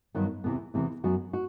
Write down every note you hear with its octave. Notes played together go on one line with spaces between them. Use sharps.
G2 D#3 F#3 B3 F#4
E2 C3 E3 B3
E2 C3 E3 B3
F#2 F#3 B3 F#4
F#4